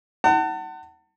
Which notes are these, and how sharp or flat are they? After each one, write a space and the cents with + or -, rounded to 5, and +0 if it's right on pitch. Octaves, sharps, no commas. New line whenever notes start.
F#5 +30 A5 +35